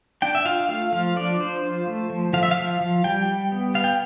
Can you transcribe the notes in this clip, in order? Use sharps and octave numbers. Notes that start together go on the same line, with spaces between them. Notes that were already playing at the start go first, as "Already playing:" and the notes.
D4 G5
E5
F4 F5
A3 F5
F3 F5
D4 D5
F3 C5
F4
A3
F3
F3 F5
E5
F5
F3
F3
G3 G5
G3
B3
B3 F5
G5